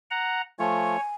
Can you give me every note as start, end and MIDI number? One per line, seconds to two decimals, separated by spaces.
0.11 0.42 78
0.11 0.42 82
0.59 0.97 53
0.59 0.97 57
0.59 0.97 65
0.59 1.00 73
0.59 1.15 80